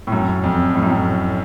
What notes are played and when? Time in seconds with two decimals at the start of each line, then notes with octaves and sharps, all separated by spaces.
0.07 A2
0.12 F#2
0.44 F2
0.75 A2
0.83 F#2
0.91 A2